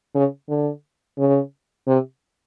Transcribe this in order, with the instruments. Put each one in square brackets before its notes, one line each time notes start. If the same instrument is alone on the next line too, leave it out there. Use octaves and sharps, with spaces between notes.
[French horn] C#3
D3
C#3
C3